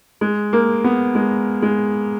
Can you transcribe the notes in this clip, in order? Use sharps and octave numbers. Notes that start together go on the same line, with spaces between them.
G#3
A#3
B3
G#3
G#3